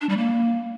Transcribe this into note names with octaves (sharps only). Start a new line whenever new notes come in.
D4
G3
A#3